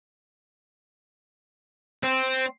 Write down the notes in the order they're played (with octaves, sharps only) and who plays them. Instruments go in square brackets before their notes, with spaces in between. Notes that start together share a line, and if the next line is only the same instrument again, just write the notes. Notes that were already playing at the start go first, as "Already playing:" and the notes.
[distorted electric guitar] C4